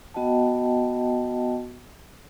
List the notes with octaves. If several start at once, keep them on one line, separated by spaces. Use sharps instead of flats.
B3 F#4 D#5 F#5 G5 A5